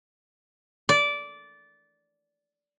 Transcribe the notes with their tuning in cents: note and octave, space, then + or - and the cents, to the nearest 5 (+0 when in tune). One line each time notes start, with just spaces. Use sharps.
D5 -15